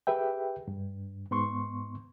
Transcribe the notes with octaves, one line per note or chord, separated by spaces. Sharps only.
G4 G#4 B4 E5 G5
G2
G#2 B3 C6 C#6